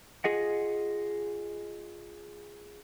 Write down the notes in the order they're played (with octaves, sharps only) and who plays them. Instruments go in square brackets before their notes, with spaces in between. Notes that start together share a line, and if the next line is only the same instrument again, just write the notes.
[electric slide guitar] F4 G#4 D#5 F#5